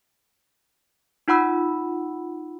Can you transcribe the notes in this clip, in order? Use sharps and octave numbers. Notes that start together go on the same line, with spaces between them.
D#4 F4 F#5 B5 E6